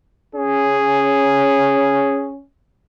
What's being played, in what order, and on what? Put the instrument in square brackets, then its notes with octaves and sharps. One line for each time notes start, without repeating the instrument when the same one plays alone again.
[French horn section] C#4 [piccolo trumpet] G#4